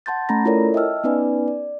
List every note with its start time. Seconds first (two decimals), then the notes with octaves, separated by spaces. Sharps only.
0.06 F#5 A5 C6 G6 A6
0.29 A3 C#4 A#5 B5 A#6
0.45 E4 F4 A4 A#4 C#5 D5
0.74 D#5 E5 G5 A5 E6 F6
1.04 B3 C#4 D#4 B4 D5 G#5
1.48 D5